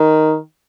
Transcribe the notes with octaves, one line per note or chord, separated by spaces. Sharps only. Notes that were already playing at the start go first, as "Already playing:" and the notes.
Already playing: D#3